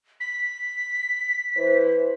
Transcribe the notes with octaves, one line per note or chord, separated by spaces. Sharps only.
B6
E3 B4 C5